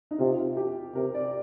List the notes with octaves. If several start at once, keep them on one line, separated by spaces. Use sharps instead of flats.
D#4
C3 F4
G4
C3 A#4
D5